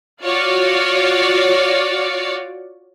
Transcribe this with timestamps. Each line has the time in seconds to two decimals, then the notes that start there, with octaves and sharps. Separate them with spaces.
0.23 F4 F#4 C#5 D5